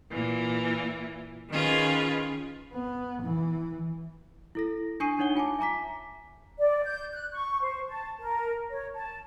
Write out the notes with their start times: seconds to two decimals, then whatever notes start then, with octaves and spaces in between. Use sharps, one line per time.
0.11 A#2 E3
1.50 D#3 C#4 F4 G#4 B4
2.73 B3
3.22 E3
4.55 E4 A4 A#6
5.00 D4 G#5 C#6 D#6 C7 D#7
5.19 D4 D#4 C#5 F#5 G7
5.35 F4 G#5 A5 D6
5.59 E5 G#5 A#5 D6 B6
6.59 D5
6.84 G6
7.13 F#6
7.33 C#6
7.61 C5
7.87 A5
8.20 A#4
8.70 C#5
8.94 A5